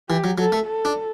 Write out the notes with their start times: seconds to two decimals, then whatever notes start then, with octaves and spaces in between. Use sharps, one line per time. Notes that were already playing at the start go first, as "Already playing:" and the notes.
0.09 E3 G4
0.24 F#3
0.38 F#3 A4
0.52 A3
0.66 A4
0.85 D4